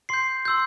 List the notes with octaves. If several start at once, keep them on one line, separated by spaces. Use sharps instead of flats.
C6 G6 C7
C6 E6 G6